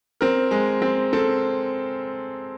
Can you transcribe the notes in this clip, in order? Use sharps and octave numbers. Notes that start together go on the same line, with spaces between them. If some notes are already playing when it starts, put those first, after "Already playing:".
C4 A#4
G#3
C4
C4 A4